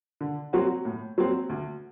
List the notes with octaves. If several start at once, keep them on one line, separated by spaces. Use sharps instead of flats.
D3
F#3 C4 F#4
A2
F#3 C4
D2